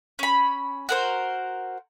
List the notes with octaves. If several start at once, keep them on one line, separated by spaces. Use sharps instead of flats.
C#4 B5
F#4 A#4 C5